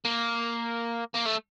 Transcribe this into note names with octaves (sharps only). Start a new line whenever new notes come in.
A#3
A#3
A3